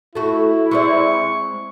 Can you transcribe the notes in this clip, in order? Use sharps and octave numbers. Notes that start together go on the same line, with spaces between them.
A3 E4 F#4
G#3 C4 D5 C#6